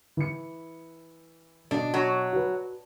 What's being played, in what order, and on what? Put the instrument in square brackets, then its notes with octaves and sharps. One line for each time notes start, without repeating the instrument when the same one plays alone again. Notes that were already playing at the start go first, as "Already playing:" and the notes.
[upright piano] E3 C#7
[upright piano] B2 D#5 [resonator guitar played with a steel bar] D4
[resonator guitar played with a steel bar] F#3
[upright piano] F#4 B4